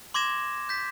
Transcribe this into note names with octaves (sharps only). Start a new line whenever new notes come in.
C6 D6 G#6 A#6 E7
G6 B6